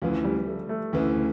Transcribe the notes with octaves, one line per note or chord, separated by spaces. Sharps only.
D2 C#3 E3 F3
G3
A3
A3
D2 C#3 E3